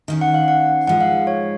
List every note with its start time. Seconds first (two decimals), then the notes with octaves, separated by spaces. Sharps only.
0.08 D#3 A#3 C#4
0.21 F#5
0.34 F5
0.48 F#5
0.87 G#2 F3 G#3 F#5
1.01 F5
1.27 C#5